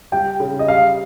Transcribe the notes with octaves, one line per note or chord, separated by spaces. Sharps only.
G3 G5
C#3
D#5
G3 F5